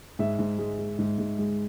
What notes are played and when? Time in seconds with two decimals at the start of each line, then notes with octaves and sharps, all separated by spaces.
0.19 G#2 E5
0.39 G#2
0.58 G#3
0.78 G#3
0.99 G#2
1.18 G#2
1.38 G#3